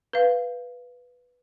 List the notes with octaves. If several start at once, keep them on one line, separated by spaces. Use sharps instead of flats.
B4 F5